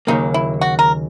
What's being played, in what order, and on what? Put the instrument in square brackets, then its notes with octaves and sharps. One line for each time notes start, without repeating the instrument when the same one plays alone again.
[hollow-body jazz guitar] D#2 C#3 F#3 A#3 [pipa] D#4
[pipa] E4
F#4
A#4